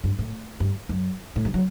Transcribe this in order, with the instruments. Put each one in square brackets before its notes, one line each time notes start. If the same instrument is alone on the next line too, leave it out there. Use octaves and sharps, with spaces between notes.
[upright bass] G2
A2
G2
F#2
A2
G2
F#3